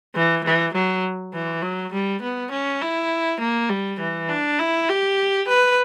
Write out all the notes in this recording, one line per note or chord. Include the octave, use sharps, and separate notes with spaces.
E3
E3
F#3
E3
F#3
G3
B3
C#4
E4
A#3
G3
E3
D4
E4
G4
B4